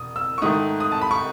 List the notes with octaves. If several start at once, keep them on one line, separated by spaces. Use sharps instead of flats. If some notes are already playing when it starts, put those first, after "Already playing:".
Already playing: E1 D#6
E6
C#6
G#2 D#3 A3 D#6
D#6
A5
B5
C#6